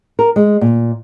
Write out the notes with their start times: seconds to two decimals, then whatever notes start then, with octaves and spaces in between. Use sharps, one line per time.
0.19 A#4
0.36 G#3
0.61 A#2